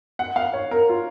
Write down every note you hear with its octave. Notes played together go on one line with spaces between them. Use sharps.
F#5
F5
C#5
A#4
F4